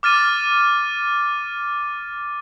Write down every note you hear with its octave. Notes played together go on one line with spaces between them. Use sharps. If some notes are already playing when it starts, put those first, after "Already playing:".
D6 F6 A6 D#7